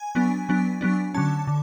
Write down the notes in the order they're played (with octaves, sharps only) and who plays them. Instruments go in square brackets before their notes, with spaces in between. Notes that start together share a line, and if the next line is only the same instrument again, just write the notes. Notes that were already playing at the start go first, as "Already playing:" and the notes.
Already playing: [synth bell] G#5
F#3 B3 D4
F#3 B3 D4
F#3 B3 D4
D3 F#3 C#4 A5
D3